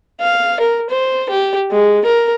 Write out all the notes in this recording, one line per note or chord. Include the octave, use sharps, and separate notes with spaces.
F5
A#4
C5
G4
G#3
A#4